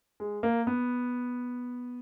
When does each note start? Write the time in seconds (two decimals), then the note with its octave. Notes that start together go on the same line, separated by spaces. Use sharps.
0.20 G#3
0.43 A#3
0.67 B3